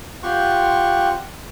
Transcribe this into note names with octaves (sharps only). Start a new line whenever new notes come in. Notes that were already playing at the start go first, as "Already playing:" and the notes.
C4 F4 G4 F#5 C6 C#6